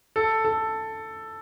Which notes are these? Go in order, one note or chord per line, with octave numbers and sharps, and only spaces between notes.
A4
A4